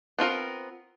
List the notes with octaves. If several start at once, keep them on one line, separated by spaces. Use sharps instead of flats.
B3 C4 F4 A#4